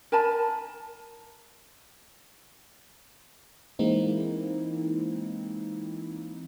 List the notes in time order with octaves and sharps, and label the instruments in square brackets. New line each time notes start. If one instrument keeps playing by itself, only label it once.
[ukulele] A#4 G#5 A5 B5
[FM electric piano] E3 G#3 A#3 C4 D#4 E4